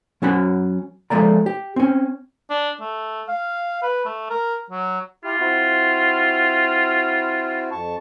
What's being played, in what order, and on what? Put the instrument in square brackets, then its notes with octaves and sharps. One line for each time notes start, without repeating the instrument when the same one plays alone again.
[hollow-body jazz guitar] F#3 C#4 F#4 B5
F3 G#3 A3 D5 A#5
G4
C4 C#4
[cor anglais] D4
A3
F5
B4
A3
A#4
F#3
[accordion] E4 G4 [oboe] F4
[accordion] C4 E4 F#4
F2 A5 C#6